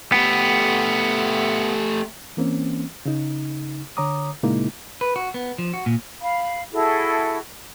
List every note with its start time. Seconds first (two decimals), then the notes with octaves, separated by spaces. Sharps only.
0.12 A3 B3 G4
2.37 E3 A#3 C4 C#4
3.06 C#3 D#4
3.97 D3 C#5 A#5 D6 D#6
4.43 A#2 C#3 G#3 A#3 D#4 E4
5.01 B4
5.16 F#4
5.34 B3
5.58 F3
5.74 F#4
5.86 A#2
6.21 F5 B5
6.72 E4 F#4 G#4 A4